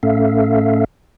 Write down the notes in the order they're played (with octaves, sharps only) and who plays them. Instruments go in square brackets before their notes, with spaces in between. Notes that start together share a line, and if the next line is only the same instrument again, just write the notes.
[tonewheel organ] A2 A3 C#4 A4 E5 F5